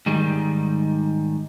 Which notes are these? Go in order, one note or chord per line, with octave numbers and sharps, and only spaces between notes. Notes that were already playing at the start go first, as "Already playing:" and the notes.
G#2 D#3 G3